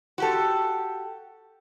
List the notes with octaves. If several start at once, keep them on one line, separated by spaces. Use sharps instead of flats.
F#4 G4 A4